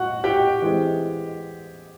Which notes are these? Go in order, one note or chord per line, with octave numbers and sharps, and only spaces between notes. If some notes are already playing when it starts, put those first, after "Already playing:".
Already playing: F#4 F#5
G4 G5
E3 G#3 C4